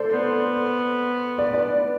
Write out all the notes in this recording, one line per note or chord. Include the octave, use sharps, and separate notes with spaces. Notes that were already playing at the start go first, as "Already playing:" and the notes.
Already playing: A4 C5 D5
B3
D5
B4 D5